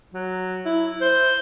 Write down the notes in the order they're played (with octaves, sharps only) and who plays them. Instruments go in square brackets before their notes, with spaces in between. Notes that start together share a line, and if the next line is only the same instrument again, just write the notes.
[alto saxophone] F#3
E4
C5